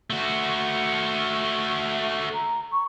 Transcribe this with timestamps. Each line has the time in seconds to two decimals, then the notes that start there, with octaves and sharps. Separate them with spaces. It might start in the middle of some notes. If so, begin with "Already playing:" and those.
0.10 A3 F#4
2.34 A#5
2.72 C#6